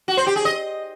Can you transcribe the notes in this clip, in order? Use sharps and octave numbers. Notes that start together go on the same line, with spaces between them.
F#4
C5
G4
G#4
D#5